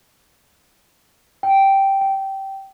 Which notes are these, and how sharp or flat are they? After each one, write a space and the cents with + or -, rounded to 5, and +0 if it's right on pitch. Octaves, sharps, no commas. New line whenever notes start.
G5 -5
G5 -15